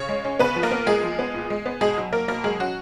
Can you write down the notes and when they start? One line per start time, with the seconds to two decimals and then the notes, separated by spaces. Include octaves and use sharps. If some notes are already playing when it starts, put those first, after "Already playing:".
Already playing: C#3 C#5
0.09 G#3
0.24 C#4
0.39 C#3 B3 B4
0.56 F3
0.63 A#3 A#4
0.71 B3
0.86 A#2 G#3 G#4
1.03 F3
1.19 B3
1.34 A#2
1.50 G#3
1.66 B3
1.81 B2 G#3 G#4
1.98 F#3
2.12 A#3 A#4
2.28 B2 A#3 A#4
2.44 F#3 G#3 G#4
2.60 C#4 F#4